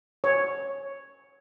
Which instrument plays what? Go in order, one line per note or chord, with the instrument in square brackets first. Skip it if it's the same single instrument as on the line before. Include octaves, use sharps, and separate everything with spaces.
[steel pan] C#5